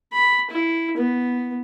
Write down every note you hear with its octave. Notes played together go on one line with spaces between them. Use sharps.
B5
E4
B3